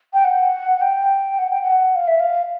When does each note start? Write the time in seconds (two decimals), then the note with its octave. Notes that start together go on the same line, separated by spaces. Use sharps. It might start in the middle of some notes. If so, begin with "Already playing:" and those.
0.14 G5
0.25 F#5
0.81 G5
1.38 F#5
1.50 G5
1.62 F#5
1.96 F5
2.08 E5
2.20 F5